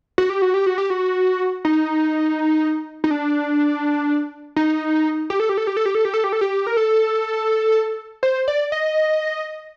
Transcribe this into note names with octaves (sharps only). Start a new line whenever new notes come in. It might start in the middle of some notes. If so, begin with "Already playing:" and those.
F#4
G4
F#4
G4
F#4
G4
F#4
D#4
D#4
D4
D#4
G4
A4
G4
A4
G4
A4
G4
A4
G4
A4
G4
A4
G4
A#4
A4
C5
D5
D#5